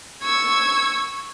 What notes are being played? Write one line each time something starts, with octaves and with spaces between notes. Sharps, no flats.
C#6 E6 G#6